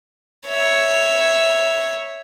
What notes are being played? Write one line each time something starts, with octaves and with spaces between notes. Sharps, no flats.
C#5 E5